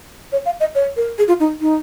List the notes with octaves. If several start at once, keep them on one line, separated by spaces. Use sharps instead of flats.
C#5
F5
D#5
C#5
A#4
G#4
F4
D#4
D#4